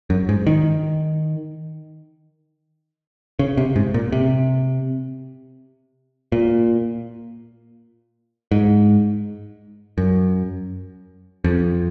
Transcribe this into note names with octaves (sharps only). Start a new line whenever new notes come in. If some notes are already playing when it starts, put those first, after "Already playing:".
F#2
G#2
D#3
C#3
C3
G#2
A#2
C3
A#2
G#2
F#2
F2